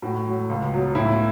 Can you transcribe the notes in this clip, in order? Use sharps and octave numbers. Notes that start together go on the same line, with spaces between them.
A2 F#4
F#3
C#2
B2 F#3
A2 E4